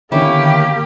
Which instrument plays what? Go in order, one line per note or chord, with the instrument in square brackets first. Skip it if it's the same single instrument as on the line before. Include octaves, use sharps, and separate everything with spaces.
[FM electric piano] D3 D#3 B3 [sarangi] A#3 [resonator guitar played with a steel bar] C#4 E4 [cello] G4